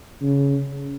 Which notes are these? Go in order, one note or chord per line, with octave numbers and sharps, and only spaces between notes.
C#3